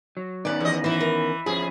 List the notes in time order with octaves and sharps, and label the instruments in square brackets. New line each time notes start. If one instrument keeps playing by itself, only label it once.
[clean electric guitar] F#3
[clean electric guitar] D#3 B3 C#4 [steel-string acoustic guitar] D5 F#5
[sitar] E2 D#5
[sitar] E3 [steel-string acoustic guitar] E4 C5
[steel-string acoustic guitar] A#4
[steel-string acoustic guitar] E2 [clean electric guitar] F3 C#4 E4 [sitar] G#4